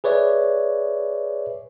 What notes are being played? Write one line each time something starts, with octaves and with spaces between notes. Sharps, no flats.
G#4 B4 C#5 D5 E5